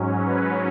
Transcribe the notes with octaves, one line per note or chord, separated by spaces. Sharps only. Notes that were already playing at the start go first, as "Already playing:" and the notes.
Already playing: G#2 F#3 C#4
B4